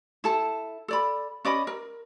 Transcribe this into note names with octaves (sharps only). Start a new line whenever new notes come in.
E4 A4 A5
A4 D5 B5
C#4 D5 D#5 B5
A#4